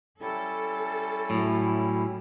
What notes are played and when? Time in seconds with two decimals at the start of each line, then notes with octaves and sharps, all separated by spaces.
0.21 G3 C#4 E4 A4
1.30 A2 F#3